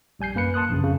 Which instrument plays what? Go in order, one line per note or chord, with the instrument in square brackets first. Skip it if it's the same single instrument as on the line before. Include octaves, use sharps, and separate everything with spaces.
[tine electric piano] A#1 G3 G#5 G6 C7
F#2 A#3 B4 C#7
A5 C6 D#6 F#6
A#1 F#2 C#3
F2 C#3